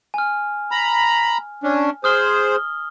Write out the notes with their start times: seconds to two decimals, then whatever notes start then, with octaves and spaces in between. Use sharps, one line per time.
0.14 G#5 F6
0.71 A#5 B5
1.63 C#4 D4
2.04 G#4 C5 D#6 F6 G7